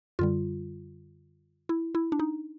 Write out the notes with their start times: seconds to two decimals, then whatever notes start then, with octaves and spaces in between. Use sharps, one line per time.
0.19 F#2 D3 G3 F4
1.69 E4
1.95 E4
2.12 D4
2.19 D#4